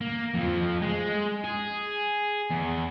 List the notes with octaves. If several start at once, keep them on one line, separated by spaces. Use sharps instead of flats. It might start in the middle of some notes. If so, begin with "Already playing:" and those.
A#3
F2 F3
G#3
G#4
E2